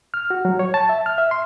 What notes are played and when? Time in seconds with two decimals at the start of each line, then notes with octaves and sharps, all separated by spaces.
0.14 F6
0.30 F#4
0.45 F#3
0.59 C#5
0.74 A5
0.89 E5
1.06 F6
1.18 E5
1.31 C6